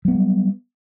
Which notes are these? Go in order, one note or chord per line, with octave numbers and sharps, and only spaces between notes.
F#3 G3 A3 B3